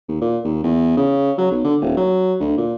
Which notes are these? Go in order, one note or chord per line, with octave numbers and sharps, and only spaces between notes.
D#2
A#2
D#2
E2
C#3
F#3
B1
D3
D#1
F#3
D2
A#2